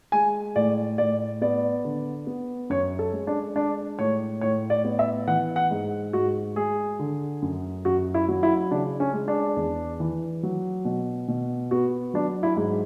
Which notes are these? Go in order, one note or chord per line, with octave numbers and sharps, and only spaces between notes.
G#3 G#5
A2 D5
A2 D5
B3 D5
D3
B3
F#2 C#5
A4
G#3
D4
G#3 D4
A2 C#5
A2 C#5
D5
B3
E5
E3 F#5
F#5
G#2
G#2 F#4
G#3 G#4
D3
F#2
F#2 F#4
E4
F#3
E4
C#3 D4
C#4
G#3
D4
E2
E3
F#3
B2
B2
B3 F#4
F#3 D4
E4
G#2